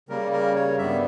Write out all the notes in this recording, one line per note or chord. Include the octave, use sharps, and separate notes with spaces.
C#3 G3 A#3 A#4
A#4
C#5
G2 G3 B3 E5